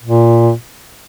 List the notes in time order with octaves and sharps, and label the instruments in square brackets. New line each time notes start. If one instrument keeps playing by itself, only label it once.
[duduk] A#2